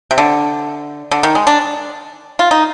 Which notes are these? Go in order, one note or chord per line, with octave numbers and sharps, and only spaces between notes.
C3
D3
D3
D#3
G#3
D4
F4
D#4